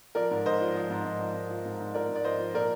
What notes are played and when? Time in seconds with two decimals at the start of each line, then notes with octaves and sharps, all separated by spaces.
0.15 F3 A#4 D5
0.31 G#2
0.46 G#2 C5 D#5
0.61 F3
0.76 F3
0.90 G#2
1.05 G#2
1.20 F3
1.35 G#2
1.50 F3
1.65 G#2
1.80 G#2
1.94 F3 A#4 D5
2.09 G#2
2.16 D5
2.24 F3 C5 D#5
2.39 F3
2.54 A#2 A#4 D5